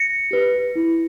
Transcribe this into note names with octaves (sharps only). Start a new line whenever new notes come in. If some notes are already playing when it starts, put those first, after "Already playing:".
Already playing: A#6 C#7
G4 B4
E4